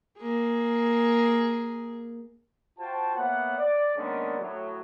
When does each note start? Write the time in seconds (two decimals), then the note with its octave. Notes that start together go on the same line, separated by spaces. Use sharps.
0.18 A#3 G#4
2.79 F4 F#4 C5 G5 A5
3.15 A#3 B3 C#5 E5 F#5
3.58 D5
3.96 D#3 G#3 A#3 B3 C#4 D4
4.39 A2 F#3